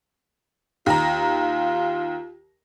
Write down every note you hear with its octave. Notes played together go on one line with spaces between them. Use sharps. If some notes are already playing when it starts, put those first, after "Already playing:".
D#2 F4 A#5